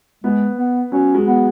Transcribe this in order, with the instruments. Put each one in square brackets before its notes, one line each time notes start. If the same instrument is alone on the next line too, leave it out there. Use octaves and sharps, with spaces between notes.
[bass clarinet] G#3 [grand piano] B3
[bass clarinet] B3
[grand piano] F#3 [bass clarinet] C#4
[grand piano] G#3
[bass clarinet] B3